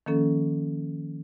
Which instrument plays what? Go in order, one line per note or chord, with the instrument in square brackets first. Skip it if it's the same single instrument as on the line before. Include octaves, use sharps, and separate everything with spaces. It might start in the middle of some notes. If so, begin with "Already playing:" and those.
[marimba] D#3 F3 A#3 C#4 A4